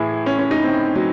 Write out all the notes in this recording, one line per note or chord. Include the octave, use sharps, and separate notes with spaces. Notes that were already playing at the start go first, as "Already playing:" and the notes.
Already playing: A2 E3 E4 G#4
C#4
C#4
D#4
C4
F#3